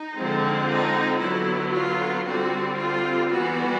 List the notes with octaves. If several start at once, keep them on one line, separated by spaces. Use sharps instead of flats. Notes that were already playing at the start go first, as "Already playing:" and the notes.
Already playing: D#4
D3 F3 G#3 C4
D#4
D3 F#3 B3 E4
F4
D3 G3 C4 F#4
F4
E3 G3 B3 F#4